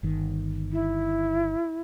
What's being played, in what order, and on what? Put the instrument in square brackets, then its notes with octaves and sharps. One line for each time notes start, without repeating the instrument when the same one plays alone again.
[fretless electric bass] G1 D#3
[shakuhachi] E4